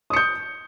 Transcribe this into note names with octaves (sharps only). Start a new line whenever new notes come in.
D#6 G6 C#7